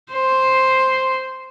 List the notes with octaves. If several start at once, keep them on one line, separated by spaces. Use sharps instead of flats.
C5